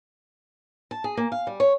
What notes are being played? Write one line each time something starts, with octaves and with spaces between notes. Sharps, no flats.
A5
G#4
A#3
F5
G3
C#5